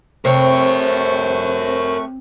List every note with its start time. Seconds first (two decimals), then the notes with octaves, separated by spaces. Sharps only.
0.25 C3 A3 A#4 C5 C#5 C#6